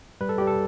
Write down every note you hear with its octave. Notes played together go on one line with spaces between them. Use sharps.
G3 B4
A4
G3 G4
A4